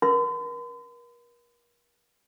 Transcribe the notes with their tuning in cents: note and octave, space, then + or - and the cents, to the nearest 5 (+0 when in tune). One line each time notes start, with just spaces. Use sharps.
A#4 +40 C6 -45